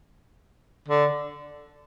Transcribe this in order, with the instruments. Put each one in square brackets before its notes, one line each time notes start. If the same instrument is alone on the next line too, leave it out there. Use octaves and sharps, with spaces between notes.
[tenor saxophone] D3